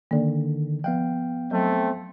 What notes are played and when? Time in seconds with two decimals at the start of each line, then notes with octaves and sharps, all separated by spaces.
0.11 D3 D#3 A#3 D5
0.84 F3 B3 F5 G5
1.51 F#3 A3 C4